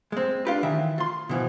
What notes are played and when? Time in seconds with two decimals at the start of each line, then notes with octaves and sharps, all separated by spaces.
0.12 G#3 C4
0.45 D4 F4 G4 B4
0.63 D#3 E3 E5
0.98 F4 C6
1.29 B2 E3 F3